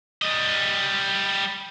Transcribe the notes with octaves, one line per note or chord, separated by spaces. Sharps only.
G3 D#5